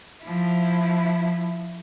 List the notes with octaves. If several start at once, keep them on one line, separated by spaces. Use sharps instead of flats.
F3 E4